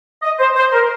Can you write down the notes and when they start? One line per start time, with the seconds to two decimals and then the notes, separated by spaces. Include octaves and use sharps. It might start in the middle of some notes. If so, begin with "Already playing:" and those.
0.23 D#5
0.39 C5
0.56 C5
0.73 A#4